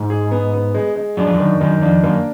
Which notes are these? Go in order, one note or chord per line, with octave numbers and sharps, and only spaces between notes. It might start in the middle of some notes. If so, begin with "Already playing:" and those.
Already playing: G#2
G#4
B3
B3
G#3
G#3
F#2 D4
F2
F#2
D#3
F#2 D#3
F2 D4
F#2 A#3